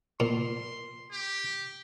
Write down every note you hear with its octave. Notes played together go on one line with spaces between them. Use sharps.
A#2 C6
G4